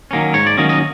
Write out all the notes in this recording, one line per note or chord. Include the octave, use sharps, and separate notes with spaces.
D#3 F#3 A#3 C#4
G#2 C#5
D5
D#3 F#3 A#3 C#4 D#5
D#5